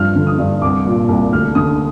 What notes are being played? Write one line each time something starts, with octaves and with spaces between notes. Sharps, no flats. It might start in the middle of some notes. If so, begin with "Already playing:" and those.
Already playing: G2 F3 F6
D3
D#6
G2
C2 D6
A#2
C2
D2 F6
D3 D#6